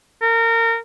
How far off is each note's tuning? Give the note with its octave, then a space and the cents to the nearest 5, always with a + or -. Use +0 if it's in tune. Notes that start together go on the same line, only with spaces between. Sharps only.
A#4 -25